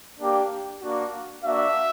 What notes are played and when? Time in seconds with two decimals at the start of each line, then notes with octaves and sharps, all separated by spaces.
0.19 A#3 D4 G4
0.82 A#3 D4 F#4
1.43 A#3 D4 F#4 E5